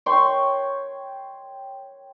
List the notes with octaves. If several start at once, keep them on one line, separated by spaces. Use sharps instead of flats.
C#5 G5 C6 C#6